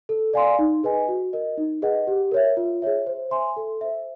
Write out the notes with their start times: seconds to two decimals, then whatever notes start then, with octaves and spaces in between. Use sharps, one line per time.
0.09 A4
0.33 D5 F5 G#5 C6
0.59 D#4
0.83 G#4 B4 D#5 G#5
1.08 F#4
1.33 A#4 D#5
1.58 D#4
1.82 G#4 B4 D#5 F#5
2.07 G4
2.32 A#4 C#5 E5
2.57 F4
2.82 G#4 C#5 E5
3.06 C5
3.31 E5 G#5 C6
3.57 A4
3.81 C5 E5